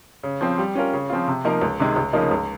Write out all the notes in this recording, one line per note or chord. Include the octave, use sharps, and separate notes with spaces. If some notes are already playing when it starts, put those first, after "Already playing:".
C#3
F3 C4
G3
C#4 F4 A#4
C#3
F3 C4 F4
C3
F3 A#3 D#4 A#4
C#2
C3 D#3 G#3
C#2
C#3 F3 A#3 D#4
C#2